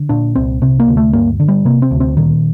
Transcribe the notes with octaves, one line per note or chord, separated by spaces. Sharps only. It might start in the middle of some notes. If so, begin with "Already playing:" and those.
Already playing: D3
A#2 D4
C2 C4
C3 C4
A#3
D2
A3
G2 A#3
D3
G3
C3 A#3
C4
D2
C4
A#2 D#3